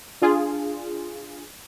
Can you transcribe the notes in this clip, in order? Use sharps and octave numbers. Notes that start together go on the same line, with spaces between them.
D4 F4 G#4